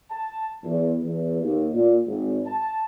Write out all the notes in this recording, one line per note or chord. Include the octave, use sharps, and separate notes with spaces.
A5
E2
E2
D#2
A#2
G#1
A5